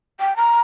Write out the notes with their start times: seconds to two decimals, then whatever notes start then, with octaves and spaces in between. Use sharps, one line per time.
0.20 G5
0.36 A#5